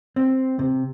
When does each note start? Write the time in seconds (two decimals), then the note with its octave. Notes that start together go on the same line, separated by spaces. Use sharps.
0.16 C4
0.59 C3